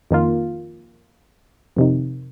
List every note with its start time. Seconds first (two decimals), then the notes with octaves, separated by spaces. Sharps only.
0.11 F2 D#3 A#3 F4
1.77 F2 C3 D#3